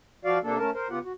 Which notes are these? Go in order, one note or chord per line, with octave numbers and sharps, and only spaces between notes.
F3 F#4 D5 F5
C3 A#3 D4 A4
A3 C#4 A#4 A5
A#4 C5
C#3 B3 F4 G4 F#5
F#4